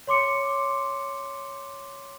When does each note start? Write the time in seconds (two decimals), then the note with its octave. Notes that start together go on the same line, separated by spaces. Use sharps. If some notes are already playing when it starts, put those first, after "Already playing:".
0.07 C#5 C6 D6 C#7